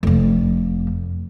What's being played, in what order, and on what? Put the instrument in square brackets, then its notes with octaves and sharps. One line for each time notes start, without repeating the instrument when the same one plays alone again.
[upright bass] F1 F2